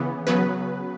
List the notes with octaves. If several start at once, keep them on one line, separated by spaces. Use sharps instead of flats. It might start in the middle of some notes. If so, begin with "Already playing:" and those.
Already playing: C#3 E3 B3
C#3 F#3 B3 B4